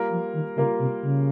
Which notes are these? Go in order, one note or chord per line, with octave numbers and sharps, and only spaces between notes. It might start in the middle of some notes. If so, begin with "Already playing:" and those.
Already playing: G3 A#3 F4 A#4
F3
D#3
C#3 G3 A#3 F4 A#4
C3
C#3